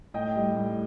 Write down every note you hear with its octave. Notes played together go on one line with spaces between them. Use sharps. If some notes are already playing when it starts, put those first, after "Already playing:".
A2 D#5 G5
G3
A2